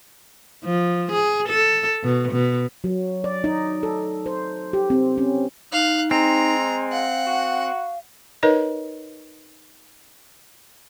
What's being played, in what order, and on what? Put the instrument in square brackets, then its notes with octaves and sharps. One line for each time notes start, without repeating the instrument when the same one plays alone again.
[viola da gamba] F3
G#4
A4
B2
B2
[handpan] F#3
D5
D#4
A4
C5
G4
C4
C#4
[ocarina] D#4 [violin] F5 F#6
[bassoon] G#3 [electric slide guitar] C4 [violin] A#5
[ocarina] F5 [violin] F#5
[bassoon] F#4
[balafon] D#4 A#4 B4 C#5 D#5